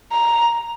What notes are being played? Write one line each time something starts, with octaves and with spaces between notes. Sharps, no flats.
A#5